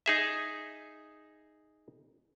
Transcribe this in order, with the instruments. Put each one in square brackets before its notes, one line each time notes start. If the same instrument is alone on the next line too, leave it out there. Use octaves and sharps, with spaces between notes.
[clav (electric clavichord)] D#4 G#4 E5